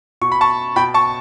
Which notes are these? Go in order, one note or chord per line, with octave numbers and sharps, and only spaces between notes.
B2 C#6
B5
A5 C#6
B2 G5 B5
A5 C#6